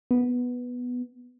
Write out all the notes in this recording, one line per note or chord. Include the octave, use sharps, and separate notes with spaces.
B3